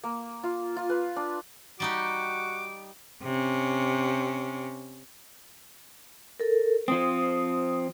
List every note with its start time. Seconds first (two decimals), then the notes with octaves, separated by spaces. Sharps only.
0.04 A#3
0.44 F4
0.76 F4
0.90 B4
1.16 D4
1.80 G3 D#4 F#4 G4 D6
3.22 C3 C#4
6.40 A4 A#4
6.88 F3 C4 D#6